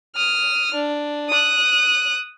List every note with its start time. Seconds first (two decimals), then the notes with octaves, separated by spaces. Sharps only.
0.16 D#6 F6
0.74 D4
1.30 D#6 F#6